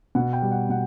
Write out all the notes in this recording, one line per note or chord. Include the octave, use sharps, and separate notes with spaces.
B2 F#5
G5
G3
F#5
B2 F#5